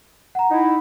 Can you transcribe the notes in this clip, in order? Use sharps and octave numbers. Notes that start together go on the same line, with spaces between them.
F#5 A#5
D#4 E4